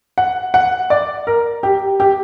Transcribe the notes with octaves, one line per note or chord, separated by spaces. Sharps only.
F#5
F#5
D5
A#4
G4
G4